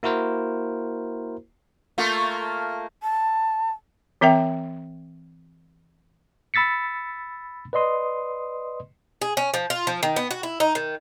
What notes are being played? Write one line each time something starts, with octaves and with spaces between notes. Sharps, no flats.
A#3 E4 F#4 A#4 C5
A3 A#3 F4
A5
E3 C4 A#4 E5 G5
B5 E6 A6 B6 C#7
B4 D5 D#5 C6 D#6
G#4
C#4
F3
F4
F3
D#3
B3
F#4
E4
D#4
D#3